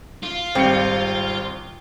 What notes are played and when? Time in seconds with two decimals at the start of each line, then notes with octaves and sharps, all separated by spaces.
0.23 F4
0.55 G#1 G3 C4 C#7